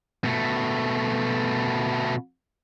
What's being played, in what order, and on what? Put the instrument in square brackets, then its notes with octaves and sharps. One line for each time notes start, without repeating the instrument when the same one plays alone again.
[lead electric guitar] B2 A3